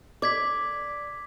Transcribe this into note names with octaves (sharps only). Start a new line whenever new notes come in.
D5 D6 G#6 B6